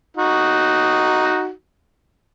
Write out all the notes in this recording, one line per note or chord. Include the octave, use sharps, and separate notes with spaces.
D#4 F#4